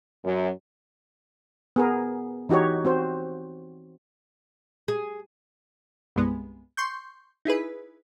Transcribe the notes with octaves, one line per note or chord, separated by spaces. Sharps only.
F#2
B3 G#4 A#4
E3 D#4 F#4 G4 C#5
C4 F#4 C5
G#4
C2 G2 G#3 B3
C6 C#6 G6
D#4 E4 G#4 B4